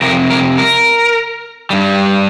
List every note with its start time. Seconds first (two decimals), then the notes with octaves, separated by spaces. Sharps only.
0.02 F2 C3 A#4
0.30 A#4
0.58 A#4
1.70 G2 G3